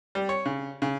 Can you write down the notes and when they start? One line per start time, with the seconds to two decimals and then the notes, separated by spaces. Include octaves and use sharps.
0.15 G3
0.29 C#5
0.46 C#3
0.82 C#3